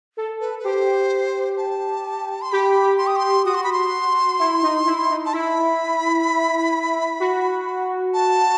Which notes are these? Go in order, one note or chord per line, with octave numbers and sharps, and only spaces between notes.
A4
B4
B4
G4 C5
A5
C6
G4 B5
C6
D#6
C6
F#4 D#6
C6
B5
C6
E4
D#4
E4
D#4
A5
E4 B5
F#4
A5